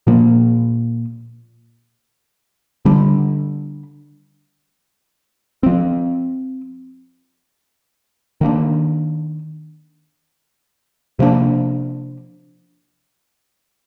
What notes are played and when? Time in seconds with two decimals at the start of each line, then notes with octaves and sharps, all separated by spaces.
0.07 A#2 F3 A#3
2.85 D3 G3 D4
5.63 F3 C4
8.41 D#3 A#3 D4
11.19 C3 F3 A#3 D4